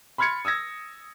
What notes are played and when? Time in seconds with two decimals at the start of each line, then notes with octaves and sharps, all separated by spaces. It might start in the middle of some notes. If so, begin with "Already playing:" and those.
0.18 B5 C6 F6 G#6 A6 C#7
0.45 D#6 E6 G#6 A#6